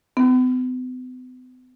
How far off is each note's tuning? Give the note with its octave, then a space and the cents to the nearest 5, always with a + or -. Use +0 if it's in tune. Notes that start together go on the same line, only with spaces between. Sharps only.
B3 +45